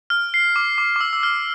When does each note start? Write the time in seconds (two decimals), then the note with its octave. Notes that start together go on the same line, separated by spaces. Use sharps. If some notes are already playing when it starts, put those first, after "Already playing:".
0.10 F6
0.34 C7
0.56 D6
0.78 D6
0.96 D6
1.01 E6
1.13 E6
1.23 F6